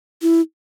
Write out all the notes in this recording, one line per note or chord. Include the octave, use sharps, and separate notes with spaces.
E4